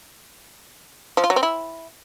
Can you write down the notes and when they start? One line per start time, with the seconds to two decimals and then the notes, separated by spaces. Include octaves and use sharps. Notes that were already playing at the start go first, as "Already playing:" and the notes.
1.17 F3
1.24 F4
1.30 F#3
1.36 C4
1.43 E4